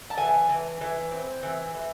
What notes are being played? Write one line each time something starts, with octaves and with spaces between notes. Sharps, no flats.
A5
E3 G#5
E3
E3
C4
E3
E3